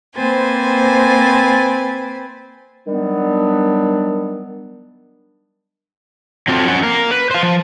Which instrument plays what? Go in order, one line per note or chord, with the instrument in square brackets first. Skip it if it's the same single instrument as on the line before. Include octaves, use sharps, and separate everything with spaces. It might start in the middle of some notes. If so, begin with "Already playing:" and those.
[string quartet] A#3 C4 B4 C5 G#5 A6
[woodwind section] D#3 F#3 G3 B3 D4
[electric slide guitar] F#3 C4 F4 A4
F2 C#4 C#5 F#5
A#3 A#4
B4
C5 F5
F3